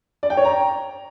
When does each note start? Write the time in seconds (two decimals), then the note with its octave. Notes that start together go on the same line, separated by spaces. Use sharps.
0.23 D5
0.30 G5
0.37 C#5
0.45 A#5